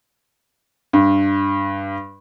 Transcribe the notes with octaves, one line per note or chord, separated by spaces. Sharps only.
G2